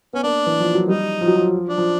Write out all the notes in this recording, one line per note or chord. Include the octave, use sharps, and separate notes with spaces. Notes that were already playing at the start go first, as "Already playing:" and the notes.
B3 C#4
A#3 D4
E3
F3
F#3
G3 D#4
F3
F#3
F3
D4
F3